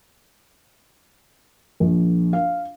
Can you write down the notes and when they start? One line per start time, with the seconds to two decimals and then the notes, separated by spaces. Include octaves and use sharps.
1.80 A#1
2.33 F5